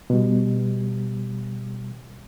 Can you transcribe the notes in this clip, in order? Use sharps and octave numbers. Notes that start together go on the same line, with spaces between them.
B2 G3